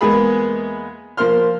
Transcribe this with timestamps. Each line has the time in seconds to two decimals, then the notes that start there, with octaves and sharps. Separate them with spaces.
0.01 E2 G#3 A#3 B3 G#4 B5
1.17 F3 A#3 C5 C6 F6